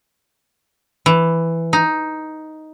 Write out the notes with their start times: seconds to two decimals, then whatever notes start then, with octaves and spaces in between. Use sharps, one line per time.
1.06 E3
1.73 D#4